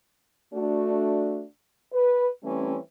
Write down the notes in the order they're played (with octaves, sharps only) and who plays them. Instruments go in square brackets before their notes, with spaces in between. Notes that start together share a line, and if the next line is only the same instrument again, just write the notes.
[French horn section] A3 D4 F#4
B4
E3 G3 A3 C4 C#4